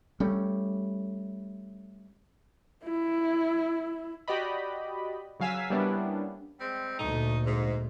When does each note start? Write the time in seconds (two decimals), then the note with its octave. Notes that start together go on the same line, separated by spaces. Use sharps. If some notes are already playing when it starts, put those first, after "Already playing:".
0.20 G3 A3 C#4
2.84 E4
4.28 F#4 G4 D5 D#5 B5
5.40 C#3 F#3 F5 G#5 E6 B6
5.70 G3 A#3 B3 C#4 D4 E4
6.60 G3 G#3 C4
6.99 D2 A#2 A3 D#4
7.46 G#2